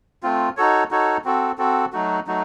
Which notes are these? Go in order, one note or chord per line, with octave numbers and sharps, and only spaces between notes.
A3 C4 F4
D#4 F#4 A4 C#5
D#4 F#4 A4 C#5
C4 F#4 A4
C4 F#4 A4
F#3 A3 D#4 F#4
F#3 A3 D#4 F#4